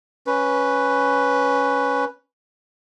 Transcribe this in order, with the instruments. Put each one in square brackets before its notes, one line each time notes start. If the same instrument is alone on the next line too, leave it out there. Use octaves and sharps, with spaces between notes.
[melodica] C#4 B4